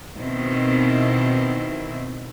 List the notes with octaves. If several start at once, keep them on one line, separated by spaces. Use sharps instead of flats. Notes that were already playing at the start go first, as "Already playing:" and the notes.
B2 D#3 C4 E4